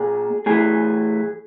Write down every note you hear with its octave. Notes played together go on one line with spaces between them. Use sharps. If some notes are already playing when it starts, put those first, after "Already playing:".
Already playing: A#2 G#4
A2 E3 G#4